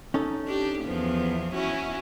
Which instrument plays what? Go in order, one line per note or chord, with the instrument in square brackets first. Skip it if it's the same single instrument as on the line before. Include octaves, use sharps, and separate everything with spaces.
[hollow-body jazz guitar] C#4 D#4 A4
[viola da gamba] D4 G4
E2 F3 B3
C#4 E4 F#4